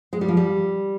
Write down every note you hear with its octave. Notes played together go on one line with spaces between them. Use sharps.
G#3
G3
F3
G3